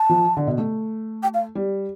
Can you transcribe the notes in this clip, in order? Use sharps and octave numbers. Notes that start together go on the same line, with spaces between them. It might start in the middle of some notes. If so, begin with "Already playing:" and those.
Already playing: A5
F3
D3
B2
A3
G5
F5
G3